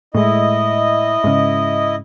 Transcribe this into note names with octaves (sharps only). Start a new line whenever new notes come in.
A2 G#3 E4 D#5
G#2 C#3